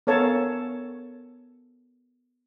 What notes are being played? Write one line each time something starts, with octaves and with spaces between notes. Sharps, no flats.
B3 A4 A#4 C#5 F5 A5